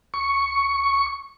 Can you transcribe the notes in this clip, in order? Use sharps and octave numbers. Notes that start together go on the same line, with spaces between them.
C#6